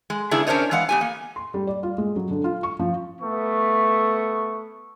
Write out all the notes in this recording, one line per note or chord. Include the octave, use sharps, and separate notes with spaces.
G#3
C#3 B3 D4 E4 G#4
C#4 D4 A#4 C5 C#5 D#5
E3 G#3 F5 F#5
B3 G4 G#5
A#3
C6
G3
D5
F4
G#3
F#3
D3
F4
C#6
F3
A3 B3 C#6